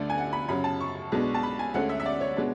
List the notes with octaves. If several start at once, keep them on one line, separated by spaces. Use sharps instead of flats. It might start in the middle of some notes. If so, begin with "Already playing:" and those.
Already playing: D2 D3 A3 D4
G#5
F#5
B5
F#2 C#3 F#3 B5
A5
C#6
B1 B2 G#3 B3 D4
A5
B5
G#5
D2 D3 G#3 C#4 F#5
E5
E5
D5
C#5
B2 G#3 B3 D4